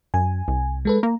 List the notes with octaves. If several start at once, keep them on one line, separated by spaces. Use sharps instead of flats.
F#2 G#5
C2
G#3 A4 B4
A#3 A#5